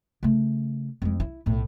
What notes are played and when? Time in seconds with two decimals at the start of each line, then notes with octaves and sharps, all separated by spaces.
0.23 C#3 A3
1.02 F2 G#3
1.20 E4
1.46 B1 A2